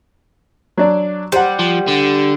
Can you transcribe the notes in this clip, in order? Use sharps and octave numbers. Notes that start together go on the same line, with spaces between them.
F#3 D4 D5
G3 C5 F#5
F3
D3